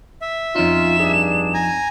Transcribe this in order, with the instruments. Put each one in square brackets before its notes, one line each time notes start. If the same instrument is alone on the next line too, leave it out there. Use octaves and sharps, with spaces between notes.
[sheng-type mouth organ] E5
[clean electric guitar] F2 D#4 [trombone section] C#4 F4 [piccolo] E7
[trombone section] G2 D4 G#4
[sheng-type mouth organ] G#5 A#5